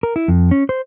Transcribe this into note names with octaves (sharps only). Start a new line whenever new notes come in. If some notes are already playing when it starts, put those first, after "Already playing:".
A#4
E4
F2
C#4
C5